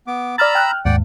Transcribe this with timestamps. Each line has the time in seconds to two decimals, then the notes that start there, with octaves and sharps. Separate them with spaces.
0.07 B3 D6
0.38 D5 A#5 B5 E6 F6 A6
0.55 G5 F6 F#6
0.85 D#2 G#2 D5 F#5 G5